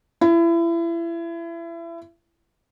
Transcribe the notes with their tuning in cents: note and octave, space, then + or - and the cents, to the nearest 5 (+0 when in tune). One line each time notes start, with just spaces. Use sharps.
E4 +30